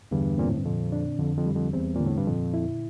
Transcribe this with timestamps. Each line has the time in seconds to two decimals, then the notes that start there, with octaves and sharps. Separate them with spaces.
0.11 E2 G2 D3
0.38 A#2 C4
0.48 A2
0.57 G2
0.65 F2 A#2
0.92 D4
1.19 F2 D3
1.37 F2
1.46 G3
1.55 F2
1.73 E2 C4
1.96 A#2 D3
2.06 A2
2.17 G2
2.26 F2 A#2
2.54 E4